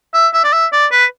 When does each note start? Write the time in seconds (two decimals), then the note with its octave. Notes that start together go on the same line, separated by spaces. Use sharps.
0.14 E5
0.34 E5
0.44 D5
0.53 E5
0.73 D5
0.92 B4